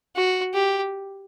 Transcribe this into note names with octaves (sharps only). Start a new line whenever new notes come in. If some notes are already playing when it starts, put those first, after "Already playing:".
F#4
G4